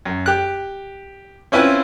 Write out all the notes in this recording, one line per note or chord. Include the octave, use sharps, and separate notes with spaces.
F#2
G4 F#6
C4 C#4 E4 F4 B4